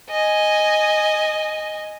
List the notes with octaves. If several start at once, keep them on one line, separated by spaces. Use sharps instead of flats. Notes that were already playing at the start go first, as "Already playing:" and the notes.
D#5 G#5